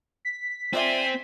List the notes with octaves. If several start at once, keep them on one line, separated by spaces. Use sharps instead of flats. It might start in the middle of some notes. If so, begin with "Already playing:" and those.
B6
C4 F4 C5 D5 E5 G#5